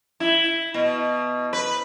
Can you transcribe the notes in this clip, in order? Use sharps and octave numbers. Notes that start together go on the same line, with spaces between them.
E4
B2
B4